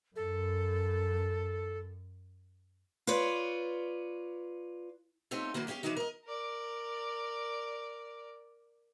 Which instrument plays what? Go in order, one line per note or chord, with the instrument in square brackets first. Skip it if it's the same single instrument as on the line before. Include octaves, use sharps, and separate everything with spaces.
[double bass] F#2 [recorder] A4
[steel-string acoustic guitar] F4 B4 C#5 D5
A3 C4 D#4 F4 G4 C#5
D3 E3 F#3 A#3 B3
G#3 C#4 G4 F5 G5
E3 F#3 G#3 C#4 D#4 F#4
A#4 D#5
[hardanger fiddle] A#4 D5